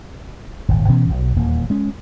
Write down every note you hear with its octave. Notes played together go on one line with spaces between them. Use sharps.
D#1 G#1
B2 E3 B3 C#4
B1 B2
D#1 E2 A#3
G#3 C#4